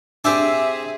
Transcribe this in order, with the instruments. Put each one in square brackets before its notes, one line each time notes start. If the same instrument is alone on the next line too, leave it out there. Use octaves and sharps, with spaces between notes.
[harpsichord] C4 G4 D5 [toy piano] D4 G#5 E6 [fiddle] G#4 [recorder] E5